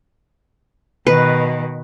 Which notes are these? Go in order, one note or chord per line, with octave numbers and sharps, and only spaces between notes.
B2 D#3 B4